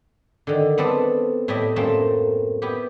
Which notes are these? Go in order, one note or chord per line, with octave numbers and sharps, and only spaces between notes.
D3 D#3
B3 C4 A4 B4 D5
A2 E4 G4 D#5 E5
F#2 A2 A3 A#3 C4 A5
B3 E4 G4